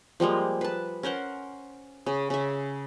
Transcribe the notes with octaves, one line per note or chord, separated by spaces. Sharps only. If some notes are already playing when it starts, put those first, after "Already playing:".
F3 G3 G#3 A#3
B4 A5
C#4 A#4 C5 F#5
C#3
C#3 E5